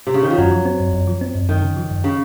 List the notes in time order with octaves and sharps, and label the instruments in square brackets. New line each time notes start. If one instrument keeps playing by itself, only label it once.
[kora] C3
C#3
D#3
F3
[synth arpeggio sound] F#2 [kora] F#3
[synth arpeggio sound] F3
C4
F#2
F#2
F3
C4
F#2
[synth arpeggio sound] F#2 [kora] D#3
[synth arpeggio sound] C#3
F3
F#2
[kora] C#3